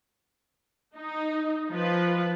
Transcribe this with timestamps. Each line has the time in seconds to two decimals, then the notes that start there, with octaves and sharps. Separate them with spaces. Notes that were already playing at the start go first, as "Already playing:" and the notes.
0.97 D#4
1.71 F3 F4 B4